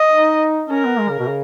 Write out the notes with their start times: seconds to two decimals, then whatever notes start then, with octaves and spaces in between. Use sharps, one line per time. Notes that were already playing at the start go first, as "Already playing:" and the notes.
Already playing: D#5
0.11 D#4
0.69 C#4 A#4
0.85 B3
0.99 G#3
1.09 C#3
1.19 B2
1.28 C#3